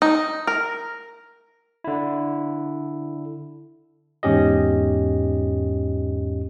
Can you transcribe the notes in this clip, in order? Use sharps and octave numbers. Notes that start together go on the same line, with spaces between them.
D#4
A#4
D3 E4
E2 G#2 C#4 G4 D#5